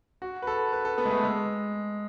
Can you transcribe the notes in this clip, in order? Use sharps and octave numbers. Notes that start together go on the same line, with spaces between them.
F#4
B4
A4
B4
A4
B3
G#3
A3
G#3